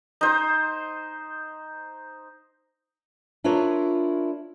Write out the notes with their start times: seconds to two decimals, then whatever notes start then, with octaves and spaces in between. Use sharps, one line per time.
0.21 D#4 C5
3.44 D4 E4 F4 A#4 C#5 D5